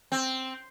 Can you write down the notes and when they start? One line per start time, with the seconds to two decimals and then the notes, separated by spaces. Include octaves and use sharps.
0.12 C4